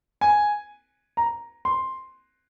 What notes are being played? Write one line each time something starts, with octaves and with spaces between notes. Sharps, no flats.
G#5
A#5
C6